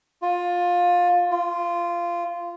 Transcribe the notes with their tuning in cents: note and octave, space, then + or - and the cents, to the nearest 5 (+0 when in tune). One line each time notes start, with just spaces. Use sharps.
F4 +20
F4 -15